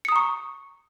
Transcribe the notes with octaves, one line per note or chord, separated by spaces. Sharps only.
A#5 C#6 D#6 C#7